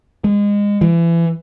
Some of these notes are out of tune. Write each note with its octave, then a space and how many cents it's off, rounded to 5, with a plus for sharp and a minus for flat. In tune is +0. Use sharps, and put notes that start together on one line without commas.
G#3 -25
E3 +30